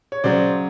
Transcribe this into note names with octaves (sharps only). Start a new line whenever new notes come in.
C#5
C#3 F#3 C5 D5